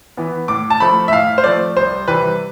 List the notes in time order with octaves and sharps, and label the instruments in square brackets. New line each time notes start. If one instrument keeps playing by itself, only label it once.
[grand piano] E3 B3
A2 D6
A5
F3 A3 C4 B5
E5
A2 F5
C5
F3 A3 C4 D5
C2 C5
C3 E3 G3 C4 B4